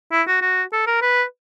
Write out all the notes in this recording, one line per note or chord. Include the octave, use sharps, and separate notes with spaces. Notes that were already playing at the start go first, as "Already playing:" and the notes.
E4
F#4
F#4
A4
A#4
B4